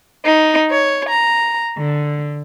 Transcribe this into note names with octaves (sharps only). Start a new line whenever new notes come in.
D#4
C#5
A#5
D3